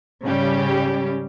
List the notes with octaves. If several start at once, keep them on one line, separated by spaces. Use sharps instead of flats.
G#2 C#3 G3 C#4 G4